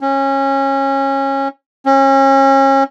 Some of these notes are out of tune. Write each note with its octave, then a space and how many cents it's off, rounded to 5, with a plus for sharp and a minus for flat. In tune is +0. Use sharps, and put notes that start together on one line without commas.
C#4 -25
C#4 -35